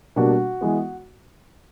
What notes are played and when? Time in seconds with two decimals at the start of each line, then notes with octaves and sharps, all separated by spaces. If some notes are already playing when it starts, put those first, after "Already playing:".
0.16 B2 G3 A#3 D4 F#4
0.61 E3 G#3 B3